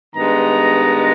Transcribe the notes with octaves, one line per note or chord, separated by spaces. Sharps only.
G2 D#3 G#3 B3 A#5